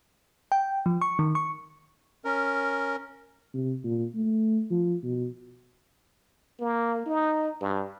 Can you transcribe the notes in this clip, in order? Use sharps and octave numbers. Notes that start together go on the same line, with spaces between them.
G5
F3
C#6
D#3
C#6
C#4 A#4
C3
A#2
A3
F3
B2
A#3
D#4
G2